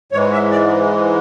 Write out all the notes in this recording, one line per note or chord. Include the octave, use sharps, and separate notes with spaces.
G#2 E3 G#3 C#5
E5
D5